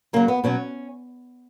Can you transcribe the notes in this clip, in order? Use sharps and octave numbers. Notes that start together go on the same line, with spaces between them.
C#3 F#3 A#3
B3
B2 F#3 C#4